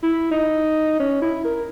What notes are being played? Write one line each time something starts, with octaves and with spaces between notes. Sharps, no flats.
E4
D#4
C#4
E4
A#4